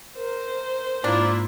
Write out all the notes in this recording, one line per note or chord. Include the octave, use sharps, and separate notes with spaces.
A#4 C5
G#2 A#3 D4 E4 F4